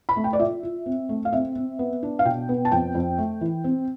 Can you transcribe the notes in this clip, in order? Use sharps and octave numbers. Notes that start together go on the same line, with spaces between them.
B5
A3
G5
D5
F4 E5
F4
C4
A3
F5
C4 E5
C4
B3
D4
F5
B2 G5
B3
A5
F2 G5
F2
A3
E3
C4